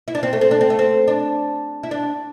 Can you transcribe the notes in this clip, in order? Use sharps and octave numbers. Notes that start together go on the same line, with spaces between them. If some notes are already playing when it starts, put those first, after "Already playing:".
E4
D4
C4
A3
C4
D4
C4
A3
C4
D4
E4
D4